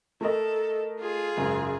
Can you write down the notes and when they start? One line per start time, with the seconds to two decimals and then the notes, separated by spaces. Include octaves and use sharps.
0.21 A3 A4 A#4 D#5
0.99 F4 G#4
1.37 F#1 G#2